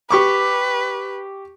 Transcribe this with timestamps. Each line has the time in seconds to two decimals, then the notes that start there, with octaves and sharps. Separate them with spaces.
0.11 G4 B4 C#6 D6